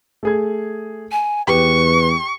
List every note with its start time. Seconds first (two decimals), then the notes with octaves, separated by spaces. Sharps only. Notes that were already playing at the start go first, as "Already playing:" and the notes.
0.23 A3 G#4 G#6
1.12 G#5
1.48 E2 G4 B4 C#6